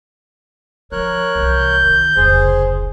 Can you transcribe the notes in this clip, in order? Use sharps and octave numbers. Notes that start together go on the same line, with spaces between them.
F3 A#4 C#5 F#6
C2 E3 G6
D#3
F1 C#2 G#4 C5